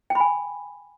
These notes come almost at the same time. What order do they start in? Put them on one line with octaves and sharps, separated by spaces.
G5 B5 G#5